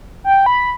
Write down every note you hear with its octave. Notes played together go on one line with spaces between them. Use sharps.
G5
B5